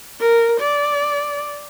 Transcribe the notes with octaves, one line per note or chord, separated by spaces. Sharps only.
A#4
D5